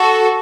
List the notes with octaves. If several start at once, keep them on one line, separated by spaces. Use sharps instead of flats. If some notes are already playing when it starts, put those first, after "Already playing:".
Already playing: F#4 A4